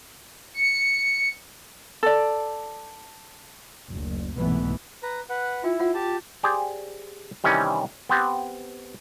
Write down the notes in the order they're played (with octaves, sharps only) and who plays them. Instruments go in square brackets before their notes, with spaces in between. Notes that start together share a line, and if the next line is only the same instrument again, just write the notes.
[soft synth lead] C#7
[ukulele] A4 D5
[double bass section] F#1 D2
C2 G#2 B2 E3 A3 B3
[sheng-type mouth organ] B4 A#5
B4 F#5
[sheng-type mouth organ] E4 [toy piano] F4 G5
[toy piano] F4 C5 F#5
[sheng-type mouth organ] G4 A5
[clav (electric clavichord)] G4 G#4 C5 D5
C3 D#3 E3 G3 C#4
B3 C4 G4